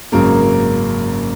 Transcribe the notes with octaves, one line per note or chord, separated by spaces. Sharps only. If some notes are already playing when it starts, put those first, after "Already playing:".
G#1 F#2 C#3 F#3 A#3 A#4